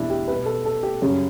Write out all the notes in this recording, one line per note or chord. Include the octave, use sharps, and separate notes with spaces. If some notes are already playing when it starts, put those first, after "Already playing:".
Already playing: E2 B2 G3 D4 E4
G4
B2 G3 B4
A4
A4
G4
F#2 C#3 G3 C#4